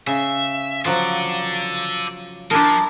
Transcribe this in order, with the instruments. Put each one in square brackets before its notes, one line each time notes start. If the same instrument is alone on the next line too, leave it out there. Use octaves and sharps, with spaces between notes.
[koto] C#3 [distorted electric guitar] E5
[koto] F3 F#3 [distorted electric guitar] A4 D5
[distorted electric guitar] F3 [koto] D4 E4 A#4 [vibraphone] A5